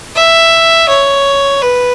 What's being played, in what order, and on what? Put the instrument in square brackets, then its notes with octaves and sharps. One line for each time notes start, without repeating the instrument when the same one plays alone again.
[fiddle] E5
C#5
B4